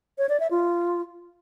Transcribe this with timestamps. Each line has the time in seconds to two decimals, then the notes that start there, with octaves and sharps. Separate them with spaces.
0.18 C#5
0.29 D5
0.40 E5
0.51 F4